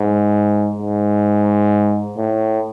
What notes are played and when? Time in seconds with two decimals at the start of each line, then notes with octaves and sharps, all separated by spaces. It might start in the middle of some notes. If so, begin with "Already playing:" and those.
Already playing: G#2
0.79 G#2
2.18 A2